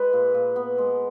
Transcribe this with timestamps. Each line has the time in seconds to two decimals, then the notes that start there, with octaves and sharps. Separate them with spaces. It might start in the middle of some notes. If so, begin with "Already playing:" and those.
Already playing: G#3 B4
0.13 A#2
0.34 A#2
0.56 B3
0.78 G#3